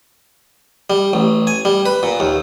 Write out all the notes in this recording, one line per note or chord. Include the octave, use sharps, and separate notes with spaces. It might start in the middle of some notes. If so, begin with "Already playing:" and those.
G3
A1
G#5
G3
B4
A#2
D#2